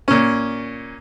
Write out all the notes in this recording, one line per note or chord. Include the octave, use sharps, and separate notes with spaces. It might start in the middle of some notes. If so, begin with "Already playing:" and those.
A#2 C#4